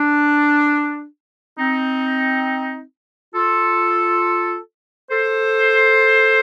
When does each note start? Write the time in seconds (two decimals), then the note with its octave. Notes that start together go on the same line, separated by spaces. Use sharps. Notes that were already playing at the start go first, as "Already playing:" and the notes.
Already playing: D4
1.58 C4 D#4
3.34 F4 A4
5.10 A4 C5